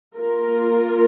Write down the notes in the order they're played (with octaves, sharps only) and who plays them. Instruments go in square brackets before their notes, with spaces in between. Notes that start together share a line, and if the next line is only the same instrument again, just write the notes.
[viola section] A#3 F4 A#4